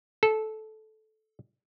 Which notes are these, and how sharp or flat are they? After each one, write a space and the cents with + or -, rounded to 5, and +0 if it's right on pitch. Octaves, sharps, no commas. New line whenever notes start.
A4 -15